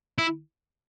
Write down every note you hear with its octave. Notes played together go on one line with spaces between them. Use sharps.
E4